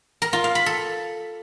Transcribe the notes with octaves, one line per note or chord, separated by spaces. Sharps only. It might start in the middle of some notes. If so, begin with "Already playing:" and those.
A#4
F4
F5
B5
A4